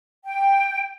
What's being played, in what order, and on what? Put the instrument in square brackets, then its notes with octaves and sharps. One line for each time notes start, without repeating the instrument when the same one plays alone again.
[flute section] G5